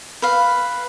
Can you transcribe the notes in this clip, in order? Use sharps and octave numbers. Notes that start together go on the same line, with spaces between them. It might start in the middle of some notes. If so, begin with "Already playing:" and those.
B4 F5